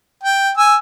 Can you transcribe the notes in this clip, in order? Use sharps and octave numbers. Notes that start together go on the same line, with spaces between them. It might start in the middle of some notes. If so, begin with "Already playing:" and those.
G5
G#5 E6